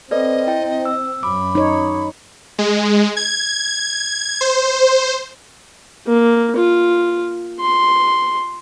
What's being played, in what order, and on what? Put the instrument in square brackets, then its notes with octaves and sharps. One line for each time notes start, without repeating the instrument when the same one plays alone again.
[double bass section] C4 [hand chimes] A4 B4 D5 [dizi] D#5
[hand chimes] E4 G5
E6
[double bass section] F#2 [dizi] B5 [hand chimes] D6
[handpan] D#4 C#5
[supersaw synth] G#3
G#6
C5
[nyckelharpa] A#3
F4
C6